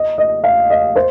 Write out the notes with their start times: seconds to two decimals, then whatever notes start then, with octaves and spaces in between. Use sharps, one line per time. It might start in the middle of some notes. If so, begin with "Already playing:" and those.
Already playing: D#5
0.18 D#5
0.44 F5
0.70 D#5
0.96 C5